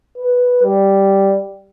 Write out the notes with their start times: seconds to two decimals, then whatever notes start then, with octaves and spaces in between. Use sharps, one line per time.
0.18 B4
0.63 G3